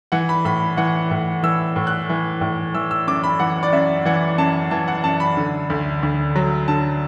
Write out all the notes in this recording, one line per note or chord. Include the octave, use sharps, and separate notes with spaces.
E3 F#5
B5
A2 B5
E3 F#5
A2
E3 E6
A2
F#6
E3
A2
E3 E6
E6
F#2 D6
B5
E3 F#5
D5
F#2 E5
E3 F#5
F#2 A5
E3 A5
F#5
F#2 A5
B5
D3
D2
D2
F#3
D3 A5